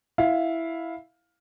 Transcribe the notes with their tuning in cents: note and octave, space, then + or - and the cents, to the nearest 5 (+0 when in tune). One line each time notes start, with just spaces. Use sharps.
E4 +0 F5 +10